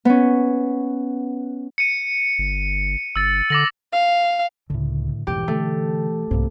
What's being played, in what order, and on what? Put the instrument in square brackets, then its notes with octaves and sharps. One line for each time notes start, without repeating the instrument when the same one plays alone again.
[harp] B3 C#4
[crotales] C#7 D#7
[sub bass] G1
[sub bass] G1 [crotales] E6 A6
[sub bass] D3 [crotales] D6 A#6 F#7
[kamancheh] F5
[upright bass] C#2 [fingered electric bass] A2 D3
[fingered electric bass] F1 B1 G#2 [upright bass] B2 E3 [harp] G4
[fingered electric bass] D3 [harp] A3
[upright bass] C2 G#2 [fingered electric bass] A#3 C4